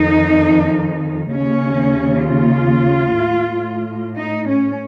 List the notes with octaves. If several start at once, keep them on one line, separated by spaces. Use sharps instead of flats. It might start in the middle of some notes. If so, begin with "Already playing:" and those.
Already playing: F2 D#3 D#4
D#2 C#3 C#4
F4
A2
D#4
C#4